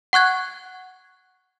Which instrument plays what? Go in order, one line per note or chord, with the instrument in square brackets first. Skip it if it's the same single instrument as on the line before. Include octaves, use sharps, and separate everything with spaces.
[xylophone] F#5 C#6 F#6 G#6